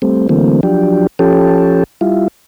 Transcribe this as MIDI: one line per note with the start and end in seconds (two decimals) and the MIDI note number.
0.02 0.28 55
0.02 0.28 57
0.02 0.28 60
0.29 0.61 50
0.29 0.61 52
0.29 0.61 54
0.29 0.61 57
0.29 0.61 58
0.29 0.61 60
0.63 1.07 53
0.63 1.07 54
0.63 1.07 62
0.63 1.07 67
1.19 1.84 53
1.19 1.84 61
1.19 1.84 67
1.19 1.84 69
2.01 2.28 55
2.01 2.28 64
2.01 2.28 65